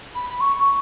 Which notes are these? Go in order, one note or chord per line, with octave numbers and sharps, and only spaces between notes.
B5
B5
C#6